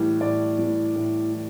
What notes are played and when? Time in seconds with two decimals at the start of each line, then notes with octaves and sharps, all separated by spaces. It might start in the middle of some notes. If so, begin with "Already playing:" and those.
Already playing: A2 E3 G3
0.21 A2 D5
0.59 E3 G3
0.96 A2
1.33 E3